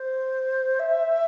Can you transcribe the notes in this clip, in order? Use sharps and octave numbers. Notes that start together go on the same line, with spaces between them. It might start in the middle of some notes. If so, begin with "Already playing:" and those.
Already playing: C5
E5